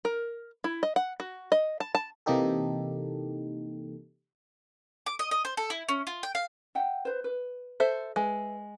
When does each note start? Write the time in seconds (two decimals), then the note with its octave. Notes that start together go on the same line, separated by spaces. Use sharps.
0.05 A#4
0.64 E4
0.83 D#5
0.96 F#5
1.20 F#4
1.52 D#5
1.80 A5
1.95 A5
2.26 C3 E3 A#3 D#4 G4 A4
5.06 D6
5.19 D#5
5.31 D#5
5.45 C5
5.57 A4
5.70 E4
5.89 C#4
6.07 F4
6.23 G5
6.35 F5
6.75 E5 F#5 G5
7.05 B4 C5
7.24 B4
7.80 A4 C5 E5
8.16 G#3 B4 E5